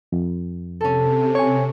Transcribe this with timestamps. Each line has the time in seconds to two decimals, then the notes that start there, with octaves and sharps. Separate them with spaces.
0.12 F2
0.81 C3 C#4 A4
1.35 C#5 G#5 C#6